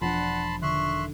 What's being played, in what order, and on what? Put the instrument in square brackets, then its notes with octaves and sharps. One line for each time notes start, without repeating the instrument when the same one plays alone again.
[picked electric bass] E1 [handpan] F3 D4 [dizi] F#5 [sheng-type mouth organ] A5 B5 C6
[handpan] D3 D#3 [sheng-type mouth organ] E5 C6 F#6 [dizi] C#6